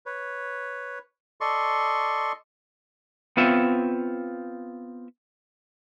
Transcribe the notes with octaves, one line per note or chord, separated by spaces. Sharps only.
B4 C#5
A4 D5 D#5 C6 C#6
B3 C4 F4 C#5 E5